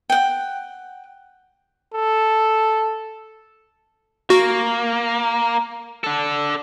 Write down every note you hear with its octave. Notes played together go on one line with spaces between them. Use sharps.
F#5 G5
A4
A#3 F#4
D4 A4